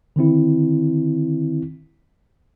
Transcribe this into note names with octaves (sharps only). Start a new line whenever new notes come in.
D3 D#3 C4 E4